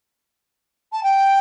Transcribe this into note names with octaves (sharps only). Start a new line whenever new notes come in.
A5
G5